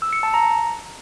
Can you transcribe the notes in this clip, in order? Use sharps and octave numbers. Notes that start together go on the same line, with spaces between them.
E6
C#7
A5
A#5